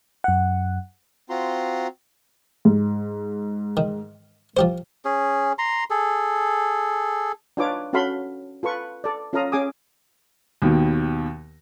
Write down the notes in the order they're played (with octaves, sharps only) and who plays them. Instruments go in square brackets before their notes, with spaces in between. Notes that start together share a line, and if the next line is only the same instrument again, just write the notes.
[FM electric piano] F#2 F#5
[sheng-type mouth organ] C4 F4 F#4 A#5 C6
[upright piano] G#2
[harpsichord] D#3
F3 G4 C5
[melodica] C#4 G#4
A#5 C6
G#4 A4
[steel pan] D4 D#4 F4 B4 C#5 D6
C#4 F#4 A4 F5 B5 C6
F4 A4 B4 C#6
A4 D5
C#4 F4 A4 F5 A#5 D#6
C#4 G#4 G#5 D6 D#6
[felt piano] D#2 B2 D#3